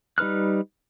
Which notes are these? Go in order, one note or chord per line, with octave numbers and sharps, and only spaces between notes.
G3 D#4 B4 F6 F#6